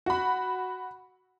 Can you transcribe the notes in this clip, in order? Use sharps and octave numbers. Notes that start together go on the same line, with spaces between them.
F#4 B5